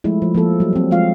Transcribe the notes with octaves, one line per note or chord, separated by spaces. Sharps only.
F3 G#3 A3 E4
F3
F3 A#3 A4
F#3 G3
F#3 C4
F3 G#3 F4 F5